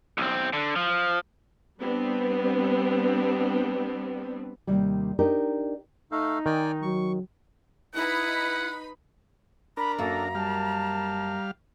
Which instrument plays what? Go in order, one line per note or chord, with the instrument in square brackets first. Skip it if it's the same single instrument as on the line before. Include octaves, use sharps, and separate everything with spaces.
[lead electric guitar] B1 C4
D3
F3
[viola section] G3 B3 C4 D4
[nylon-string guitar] D#2 C3 G3
D4 D#4 G4 A#4
[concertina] A3 A4 F5 [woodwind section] D#4
[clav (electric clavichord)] D#3 [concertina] D5 G5 G#5
[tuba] F#3 [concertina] C#6
[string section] D#4 B4 B5 [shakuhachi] E4 [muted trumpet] F#5
[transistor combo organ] D4 A#4 [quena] A#5 [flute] B5
[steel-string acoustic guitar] F#2 A#3 [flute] A4
[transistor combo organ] G3 F5 [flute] A5